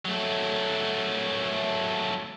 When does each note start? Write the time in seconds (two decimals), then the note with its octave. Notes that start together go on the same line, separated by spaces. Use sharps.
0.05 F#3 A3